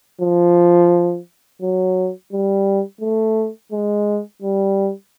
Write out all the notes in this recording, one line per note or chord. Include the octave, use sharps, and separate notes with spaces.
F3
F#3
G3
A3
G#3
G3